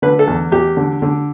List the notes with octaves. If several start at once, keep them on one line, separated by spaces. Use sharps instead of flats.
D3 B4
A4
E2
E2 G4
D3
D3